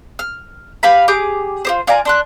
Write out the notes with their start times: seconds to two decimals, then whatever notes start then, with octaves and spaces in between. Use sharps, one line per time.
0.19 F6
0.83 G4 B4 F5 B5
1.08 G4 G#4 D6
1.65 F4 G4 C5
1.87 F4 D5 G#5 A#5
2.05 D4 C6 F#6